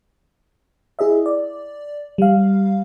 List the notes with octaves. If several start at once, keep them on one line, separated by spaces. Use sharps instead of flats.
E4 G#4 D#5 E5
D5
G3 F5